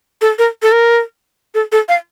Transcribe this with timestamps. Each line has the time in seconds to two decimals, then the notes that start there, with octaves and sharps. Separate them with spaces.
0.21 A4
0.39 A#4
0.62 A4
0.72 A#4
1.55 A4
1.72 A4
1.89 F5